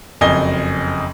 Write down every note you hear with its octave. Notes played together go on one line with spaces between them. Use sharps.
F#1 F2 D#5 G#5 G7